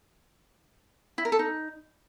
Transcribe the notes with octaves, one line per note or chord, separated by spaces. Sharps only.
E4
A#4
A4
D#4